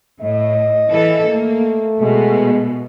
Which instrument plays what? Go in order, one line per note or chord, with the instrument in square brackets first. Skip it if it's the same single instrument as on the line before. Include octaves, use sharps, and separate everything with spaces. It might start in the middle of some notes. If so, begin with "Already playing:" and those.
[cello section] A2 [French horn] D#5
[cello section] E3 A4
[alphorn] A3 [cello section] A#3
[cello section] B2 [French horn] G#3